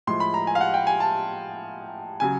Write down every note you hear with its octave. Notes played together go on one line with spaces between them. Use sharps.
A2 F3 G#3 C6
B5
A#5
G#5
F5
F#5
G5
G#5
A5
C#3 F#3 G#5